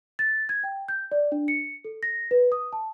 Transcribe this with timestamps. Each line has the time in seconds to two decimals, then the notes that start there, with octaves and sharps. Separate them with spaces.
0.19 A6
0.49 G#6
0.64 G5
0.88 G6
1.12 D5
1.32 D4
1.48 C#7
1.85 A4
2.03 A#6
2.31 B4
2.52 D#6
2.73 A5